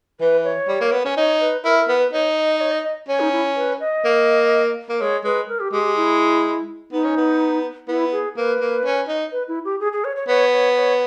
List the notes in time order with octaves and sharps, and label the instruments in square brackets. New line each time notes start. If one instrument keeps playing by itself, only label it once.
[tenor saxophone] E3 [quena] B4
[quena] C#5
[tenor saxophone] G3
A#3
B3
C#4
[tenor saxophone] D#4 [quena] C#5
[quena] B4
[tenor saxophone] E4 [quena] A#4
[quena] A#4
[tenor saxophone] B3
[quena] B4
[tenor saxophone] D#4 [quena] C#5
[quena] D#5
D#5
C#5
D#5
D#5
[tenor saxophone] C#4 [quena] C#5
[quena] D#4
E4
B4
D#5
[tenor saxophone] A#3
A#3
[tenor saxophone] G#3 [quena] C#5
[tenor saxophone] G#3 [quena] B4
[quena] A#4
G4
[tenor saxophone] G#3 [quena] G4
[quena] G4
E4
[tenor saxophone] B3 [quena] D#4
[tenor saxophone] C#4
B3
[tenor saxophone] B3 [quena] E4
[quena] G#4
[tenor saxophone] A#3 [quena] B4
[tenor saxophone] A#3
C#4
D#4
[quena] B4
E4
G4
G#4
G#4
C#5
C#5
[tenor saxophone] B3 [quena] C#5
[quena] C#5
C#5